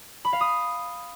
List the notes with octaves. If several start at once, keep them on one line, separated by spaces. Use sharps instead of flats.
B5
F5
D#6